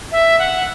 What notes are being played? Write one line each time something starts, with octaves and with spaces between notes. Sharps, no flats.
E5
F#5